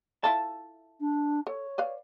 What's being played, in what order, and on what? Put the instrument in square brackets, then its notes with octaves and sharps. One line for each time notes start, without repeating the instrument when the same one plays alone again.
[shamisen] E4 F4 A4 [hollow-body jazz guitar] A5
[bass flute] D4
[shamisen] A4 [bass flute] C#5
[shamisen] B4 D5 F5